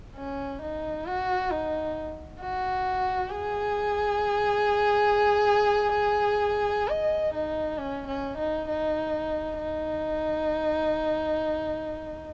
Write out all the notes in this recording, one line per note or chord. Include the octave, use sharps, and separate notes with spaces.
C#4
D#4
F#4
D#4
F#4
G#4
D#5
D#4
C#4
C#4
D#4
D#4
D#4